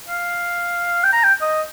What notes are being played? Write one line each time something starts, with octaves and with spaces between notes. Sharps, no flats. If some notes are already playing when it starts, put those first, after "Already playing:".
F5
G5
A#5
G5
D#5